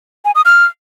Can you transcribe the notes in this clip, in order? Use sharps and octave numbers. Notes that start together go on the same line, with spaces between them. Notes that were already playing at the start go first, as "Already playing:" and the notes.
G#5
D#6
F6